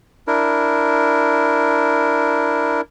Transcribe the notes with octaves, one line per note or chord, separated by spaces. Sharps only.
D4 E4 A#4